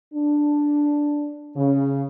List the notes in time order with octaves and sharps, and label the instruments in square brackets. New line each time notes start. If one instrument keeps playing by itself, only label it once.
[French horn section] D4
C#3